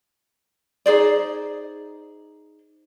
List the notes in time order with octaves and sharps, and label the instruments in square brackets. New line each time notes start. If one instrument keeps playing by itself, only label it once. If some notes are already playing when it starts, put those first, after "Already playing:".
[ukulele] D#4 G#4 C5 D5